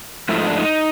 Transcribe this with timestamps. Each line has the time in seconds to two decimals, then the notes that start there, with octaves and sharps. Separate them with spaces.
0.29 G#2 F3 A3 E4
0.38 D#4
0.47 D4
0.56 D#4